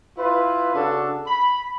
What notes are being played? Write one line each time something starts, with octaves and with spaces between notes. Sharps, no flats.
E4 F4 B4
C#3 D4 F#4 A4
B5